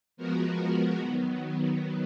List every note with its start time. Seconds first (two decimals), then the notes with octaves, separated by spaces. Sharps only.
0.17 F3 G#3 B3 F#4 A#4
1.00 D#3 F#3 B3